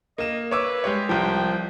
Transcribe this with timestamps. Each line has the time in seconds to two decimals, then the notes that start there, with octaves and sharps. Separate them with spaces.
0.18 A#3 D#5 E7
0.51 B4 C#5 D6 E6
0.84 G#3 G4 C#5
1.09 C2 F3 G5